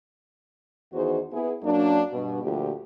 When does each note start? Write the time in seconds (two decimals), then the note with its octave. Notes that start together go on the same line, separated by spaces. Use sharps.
0.93 E2 D#3 D#4 F#4 G#4 C5
1.33 B3 E4 G#4
1.64 F#2 F#3 A#3 D4
2.12 G2 B2
2.43 D2 A#2 F3 G4